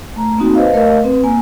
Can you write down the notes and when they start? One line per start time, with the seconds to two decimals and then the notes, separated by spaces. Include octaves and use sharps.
0.16 A3 A#5
0.38 A#3 C4 D#4 F#4
0.55 B4 C5 D#5 F5
0.74 A3 A#4 D#5 F5
1.04 C4 B4
1.24 A#3 G#5